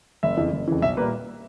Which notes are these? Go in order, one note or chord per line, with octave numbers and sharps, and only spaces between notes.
F#1 E5
F2 C#3 E3
F#1
F2 C#3 E3
B1 E5
A#2 G3 A#3 B4